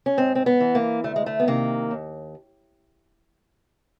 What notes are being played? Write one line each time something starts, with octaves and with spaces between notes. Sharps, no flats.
C#4
G#2 C4
C4
B3
E3
A#3
D2 A3
G#3
A3
B3
C3 D#3 A#3
D#2